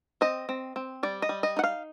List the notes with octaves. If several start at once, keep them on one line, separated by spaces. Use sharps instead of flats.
C4 D#5
C4
C4
G3 D5
D#5
G3
D#5
D#4 F#5
F5